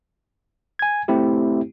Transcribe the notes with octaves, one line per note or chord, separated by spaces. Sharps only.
G#5 G#6
A3 C4 E4 G4